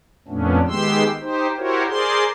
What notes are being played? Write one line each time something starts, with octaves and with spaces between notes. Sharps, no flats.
F2 A#2 A3 B3 C#4 D4
D#3 G#3 B3 G4 C6 E6
D#4 G4 C5
E4 F#4 G4 A#4 C5 C#5
G#4 A#4 C5 D5 C6